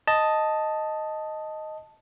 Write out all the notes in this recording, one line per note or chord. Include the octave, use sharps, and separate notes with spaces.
D#5 A5